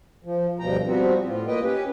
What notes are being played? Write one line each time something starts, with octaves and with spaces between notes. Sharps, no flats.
F3
D2 G2 B2 F3 G5 A#5
F3 G3 B3 C4 F#4
A2 F4
A#3 B4 D#5 G5
C#4 G4 B4